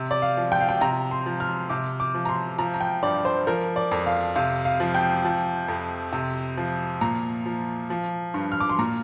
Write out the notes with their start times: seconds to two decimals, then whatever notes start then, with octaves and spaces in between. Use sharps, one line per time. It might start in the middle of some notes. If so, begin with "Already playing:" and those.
Already playing: C3
0.11 D5
0.22 F5
0.37 F3
0.52 G5
0.61 F5
0.69 G5
0.81 C3 A#5
1.11 C6
1.26 F3
1.40 F6
1.70 C3 D6
2.00 D6
2.15 F3
2.25 A#5
2.29 C6
2.59 F3 A#5
2.74 A#5
2.81 G5
3.03 G2 D5
3.25 C5
3.47 F3 A#4
3.76 D5
3.91 F2
4.06 F5
4.36 C3 F5
4.65 F5
4.80 F3
4.95 G5
5.25 F3
5.68 F2
6.12 C3
6.57 F3
7.01 A#2 A#5
7.46 F3
7.90 F3
8.34 G2
8.52 F6
8.60 D6
8.70 C6
8.79 A#2 A#5